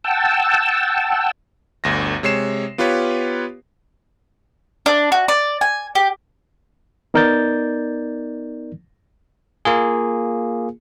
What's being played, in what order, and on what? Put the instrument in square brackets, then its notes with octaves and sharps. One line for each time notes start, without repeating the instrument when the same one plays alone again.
[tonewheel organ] F#5 G5 A5 E6
[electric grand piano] G1 D2 A#6
C3 G#3 C#5 C7 E7
B3 F4 G4 B4 C#5
[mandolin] D4
F#4
D5
G#5
G4
[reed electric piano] B3 D#4 A#4 D5 G6 A6
[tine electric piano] A#3 F4 G#4